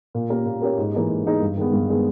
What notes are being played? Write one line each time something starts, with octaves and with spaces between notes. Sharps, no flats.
A#2
A#3 C#4 G4 A#4
A#2
A#3 C#4 G4 A#4
G#2
E3 A#3 D#4 G#4
G#2
E3 A#3 D#4 G#4
G2
D#3 G#3 B3
G2
D#3 G#3 B3